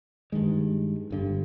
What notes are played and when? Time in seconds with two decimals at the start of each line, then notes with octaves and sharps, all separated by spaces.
0.32 G2 D#3 G#3
1.11 G1 G2 D3